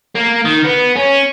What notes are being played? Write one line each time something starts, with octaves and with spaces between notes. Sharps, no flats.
A#3
D#3
B3
C#4